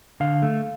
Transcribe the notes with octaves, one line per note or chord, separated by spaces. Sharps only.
D3 F5
A3